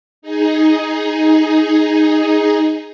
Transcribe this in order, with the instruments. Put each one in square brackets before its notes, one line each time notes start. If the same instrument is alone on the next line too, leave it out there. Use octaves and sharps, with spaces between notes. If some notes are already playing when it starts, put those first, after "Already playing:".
[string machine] D#4 G#4